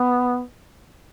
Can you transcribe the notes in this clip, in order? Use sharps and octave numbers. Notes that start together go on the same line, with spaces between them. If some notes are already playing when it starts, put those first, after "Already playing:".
Already playing: B3